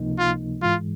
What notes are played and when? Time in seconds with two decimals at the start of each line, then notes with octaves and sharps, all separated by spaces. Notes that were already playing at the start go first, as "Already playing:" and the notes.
Already playing: C#2 C3 F3 A#3 D#4
0.19 F4
0.62 G#2 E3 G#3 F4